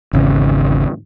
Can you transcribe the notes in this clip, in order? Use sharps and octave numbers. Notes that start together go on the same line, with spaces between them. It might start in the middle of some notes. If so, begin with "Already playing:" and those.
G#1 E2 C#3